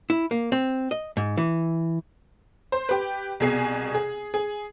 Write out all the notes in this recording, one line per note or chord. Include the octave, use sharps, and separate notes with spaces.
E4
A#3
C4
D#5
G#2
E3
C5
G4 B4
C2 B2 G#4 G#5 C7
G#4
G#4